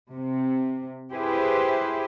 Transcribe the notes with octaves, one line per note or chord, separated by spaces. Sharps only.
C3
E4 G4 G#4 B4 C5